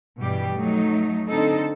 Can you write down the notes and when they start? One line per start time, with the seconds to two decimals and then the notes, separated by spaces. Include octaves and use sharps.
0.20 G2 B2 E3 G3 G4
0.56 F#3 A3 D#4
1.29 D3 C4 D#4 A4